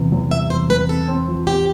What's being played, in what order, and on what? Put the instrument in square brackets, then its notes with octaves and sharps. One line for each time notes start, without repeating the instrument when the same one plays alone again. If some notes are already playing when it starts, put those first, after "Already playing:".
Already playing: [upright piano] E2 C3
E2
[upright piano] G3 [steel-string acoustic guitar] E5
[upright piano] E2 [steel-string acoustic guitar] C5
[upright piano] E2 [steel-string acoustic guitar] B4
[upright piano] C4 [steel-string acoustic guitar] A4
[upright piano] C4
F3
[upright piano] C4 [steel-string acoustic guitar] G4